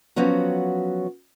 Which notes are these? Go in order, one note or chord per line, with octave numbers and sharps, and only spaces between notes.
F3 F#3 B3 C#4 F#4